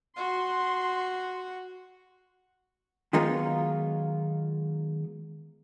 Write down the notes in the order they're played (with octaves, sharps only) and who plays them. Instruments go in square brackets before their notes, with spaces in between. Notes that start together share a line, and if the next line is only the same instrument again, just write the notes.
[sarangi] F#4 [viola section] C6
[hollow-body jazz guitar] D#3 F#3 G#3 B3 D#4 F4